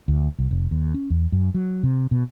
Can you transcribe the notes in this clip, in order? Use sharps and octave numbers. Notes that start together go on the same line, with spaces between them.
D2
C2
F1
D#2
C#4
E2
F#2
F#3
C3
B2